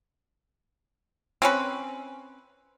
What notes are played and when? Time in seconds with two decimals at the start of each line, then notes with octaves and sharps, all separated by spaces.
1.42 C4 C#4 B4